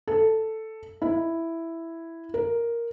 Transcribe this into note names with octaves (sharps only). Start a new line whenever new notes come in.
A4
E4
A#4